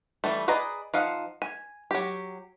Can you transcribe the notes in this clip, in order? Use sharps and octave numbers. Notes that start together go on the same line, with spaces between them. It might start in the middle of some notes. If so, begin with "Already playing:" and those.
E3 G3 A3
G#4 B4 D5 D#5 A#5
F3 D#4 F5 F#5
G#5
F#3 G4